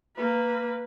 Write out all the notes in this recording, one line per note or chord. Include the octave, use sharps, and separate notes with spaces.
A#3 B4